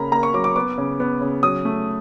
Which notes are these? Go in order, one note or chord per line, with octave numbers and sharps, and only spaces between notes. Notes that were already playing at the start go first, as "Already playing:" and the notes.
Already playing: C#3 A#3 A#5 B5
A#3 A#5
C#6
F#3 D6
D6
B3 D6
C#3
B3
C#3
F#3 D#6
A3